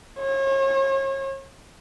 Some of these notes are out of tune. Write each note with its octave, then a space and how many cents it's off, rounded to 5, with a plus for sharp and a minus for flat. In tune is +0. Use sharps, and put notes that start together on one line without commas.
C#5 -40